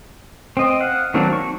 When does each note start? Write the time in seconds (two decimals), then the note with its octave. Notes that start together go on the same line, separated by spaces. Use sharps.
0.57 C4 D#5
0.81 F5 F#5
1.14 D#3 F#3 A#3 C4 D4
1.33 C#6